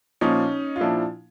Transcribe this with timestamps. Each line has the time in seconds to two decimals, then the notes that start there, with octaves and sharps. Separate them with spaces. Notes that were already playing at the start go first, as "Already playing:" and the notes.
0.21 A#2 F3 C#4 D#4
0.76 F4
0.81 A#2 F3 D4 E4